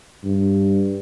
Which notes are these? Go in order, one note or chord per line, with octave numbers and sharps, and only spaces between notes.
G2